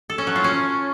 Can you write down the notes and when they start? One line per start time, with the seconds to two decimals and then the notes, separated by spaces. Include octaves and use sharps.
0.10 A4
0.18 C#4
0.27 F#3
0.36 F4
0.44 C#4